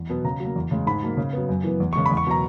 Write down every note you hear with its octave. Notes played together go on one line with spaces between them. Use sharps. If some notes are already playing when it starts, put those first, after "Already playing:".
Already playing: E2
B2 F#3 B3
C#3 A#5
F#3 A#3
E2
C#3 G#3
G#2 B5
F#3 A#3
C#3
F#3 B3
F#2
E3 B3
E2
C#3 G#3 C#6
B5
E2
C#6
B2 F#3 A#5